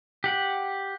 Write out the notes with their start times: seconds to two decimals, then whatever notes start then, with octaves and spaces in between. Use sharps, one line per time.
0.24 G4 F#5